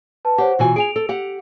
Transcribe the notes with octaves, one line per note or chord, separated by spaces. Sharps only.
B4 A5
G4 C5 C#5 F#5
B2 E3 F4 F#4 G#5
G#4 G#5 D7 F7
A4
G4 F#5